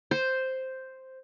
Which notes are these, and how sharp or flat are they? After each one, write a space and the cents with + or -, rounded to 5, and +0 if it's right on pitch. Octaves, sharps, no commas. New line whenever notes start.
C5 +0